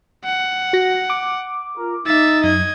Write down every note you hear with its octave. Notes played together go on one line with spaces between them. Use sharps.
F#5
F#4 A#6
D6
F4 A#4
D#4 E5 A6
F#2 D#5 G#6